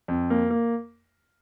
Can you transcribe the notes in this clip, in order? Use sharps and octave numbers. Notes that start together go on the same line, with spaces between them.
F2
A#3
A#3